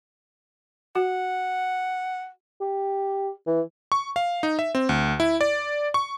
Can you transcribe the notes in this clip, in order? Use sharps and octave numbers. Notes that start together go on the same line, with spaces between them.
F#4 F#5
G4
E3
C#6
F5
D#4
E5
C4
D2
E4
D5
C#6